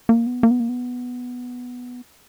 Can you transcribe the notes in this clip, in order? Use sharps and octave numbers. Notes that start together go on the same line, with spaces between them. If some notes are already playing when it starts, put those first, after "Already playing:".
A#3
B3
A#3
B3
A#3
B3